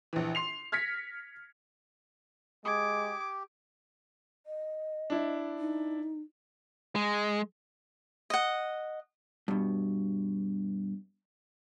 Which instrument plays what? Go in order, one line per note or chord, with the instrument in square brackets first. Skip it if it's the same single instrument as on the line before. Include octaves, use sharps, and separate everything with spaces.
[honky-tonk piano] A#1 E3
C6 C7 F7
F6 G#6 A#6 B6 C#7
[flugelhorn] G#3 [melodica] G4 [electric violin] D6 [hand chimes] D#6 G#6
[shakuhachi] D#5
[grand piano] D4 E4
[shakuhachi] D#4
[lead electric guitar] G#3
[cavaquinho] D#5 F#5
[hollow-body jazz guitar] G2 B2